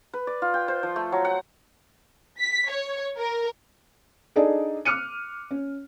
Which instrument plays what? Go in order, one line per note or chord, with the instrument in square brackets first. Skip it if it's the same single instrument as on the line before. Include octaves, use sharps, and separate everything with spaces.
[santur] B4
D5
F4
G5
C5
F3
A3
F#3
F#5
[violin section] B6
C#5
A#4
[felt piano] D4 D#4 G#4 A4 D5
D6 F6 F#6 C#7 D#7
C#4